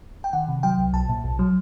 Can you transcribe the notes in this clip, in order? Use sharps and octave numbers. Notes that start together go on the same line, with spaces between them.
G5
D#3 F#5
C3
F#3 G5
C2
B1 A5
A#2
B1
F#3